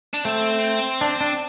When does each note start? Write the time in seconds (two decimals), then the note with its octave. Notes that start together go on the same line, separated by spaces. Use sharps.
0.14 D4
0.25 A3 C4
1.01 D4
1.21 D4